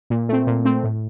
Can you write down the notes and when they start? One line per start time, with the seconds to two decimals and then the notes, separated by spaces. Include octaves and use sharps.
0.10 A#2
0.29 A3 C4
0.47 A#2
0.65 A3 C4
0.84 A2